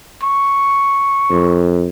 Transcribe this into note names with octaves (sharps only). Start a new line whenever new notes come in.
C#6
F2